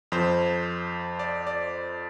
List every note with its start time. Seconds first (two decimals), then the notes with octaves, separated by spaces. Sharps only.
0.12 F2 F3 C5
1.19 D5
1.47 D5